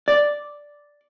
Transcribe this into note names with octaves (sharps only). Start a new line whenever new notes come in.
D5